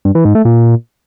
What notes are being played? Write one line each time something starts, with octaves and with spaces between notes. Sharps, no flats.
G2
E3
G#2
A3
A#2